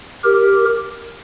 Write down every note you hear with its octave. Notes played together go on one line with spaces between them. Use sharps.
G4 A#4